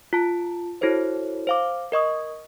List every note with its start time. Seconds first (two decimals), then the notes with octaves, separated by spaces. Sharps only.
0.13 F4 A5
0.81 E4 F#4 A4 C5 C#5
1.47 C5 F5 D6
1.92 A#4 D#5 C#6 D#6